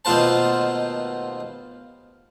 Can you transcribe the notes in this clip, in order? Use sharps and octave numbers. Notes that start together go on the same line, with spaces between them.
D#2 B2 A3 F4 C5 A5